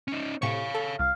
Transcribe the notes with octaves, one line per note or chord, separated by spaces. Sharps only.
C#4 D#4
A2 C3 C#5 F5 C#6
A4
C2 F5